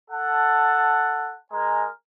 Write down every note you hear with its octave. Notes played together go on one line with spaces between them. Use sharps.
A4 F#5 A5
G#3 A#4 G#5 A#5